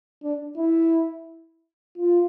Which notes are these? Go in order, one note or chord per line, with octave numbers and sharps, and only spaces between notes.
D4
E4
F4